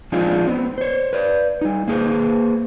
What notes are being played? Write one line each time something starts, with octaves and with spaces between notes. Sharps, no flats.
F3 G#3 C4 D4 D#4 F4
B3 C4
C5 C#5
B4 D5
G3 D#4
A#3 G#4 B4 C5